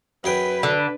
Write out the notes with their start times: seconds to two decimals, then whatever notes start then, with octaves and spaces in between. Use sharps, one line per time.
0.24 F#2 G#4 B4 G5
0.63 D3